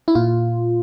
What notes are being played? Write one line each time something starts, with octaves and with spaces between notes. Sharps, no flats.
E4
A#2 F4